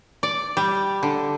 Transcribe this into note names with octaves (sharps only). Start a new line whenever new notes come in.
D5
G3
D3